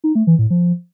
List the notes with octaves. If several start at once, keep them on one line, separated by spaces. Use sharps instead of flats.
D#4
A3
E3
A2
F3